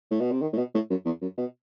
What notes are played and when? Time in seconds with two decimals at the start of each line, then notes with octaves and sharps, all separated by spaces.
0.11 A2
0.21 B2
0.32 C3
0.42 D#3
0.53 A2
0.58 B2
0.74 A2
0.90 F#2
1.06 E2
1.22 F#2
1.38 B2